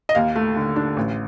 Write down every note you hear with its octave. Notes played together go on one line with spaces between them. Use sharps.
D#5
D#2 F5
A3
D3
D4
A1